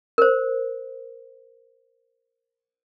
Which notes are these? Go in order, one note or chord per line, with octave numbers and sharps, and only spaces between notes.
A#4 C5